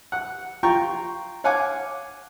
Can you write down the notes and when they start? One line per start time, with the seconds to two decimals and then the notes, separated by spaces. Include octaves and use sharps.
0.12 F#5
0.63 F4 G5 A#5 C#6
1.44 C#5 F5 F#5 G#5 D6